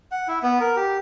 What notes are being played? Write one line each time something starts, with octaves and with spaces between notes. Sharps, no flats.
F#5
E4
B3
A#4
G4